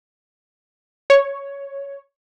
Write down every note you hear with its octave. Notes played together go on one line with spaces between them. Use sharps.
C#5